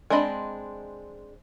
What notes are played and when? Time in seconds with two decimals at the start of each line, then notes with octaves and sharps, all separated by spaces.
0.10 G#3 C4 D4 D#5 B5